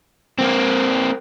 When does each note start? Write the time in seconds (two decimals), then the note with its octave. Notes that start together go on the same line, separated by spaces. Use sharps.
0.38 A#3 C4